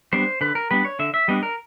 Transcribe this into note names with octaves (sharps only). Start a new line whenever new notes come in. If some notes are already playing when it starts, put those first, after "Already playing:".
G3 B3 D4 C5
D3 B4
A#4
G3 B3 D4 B4
C#5
D3 E5
E5
G3 B3 D4 D#5
A#4